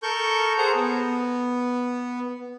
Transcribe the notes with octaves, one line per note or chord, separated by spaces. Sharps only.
A4 A#4 C#6 G6
G#4 A4 C5 F#5 A#5
B3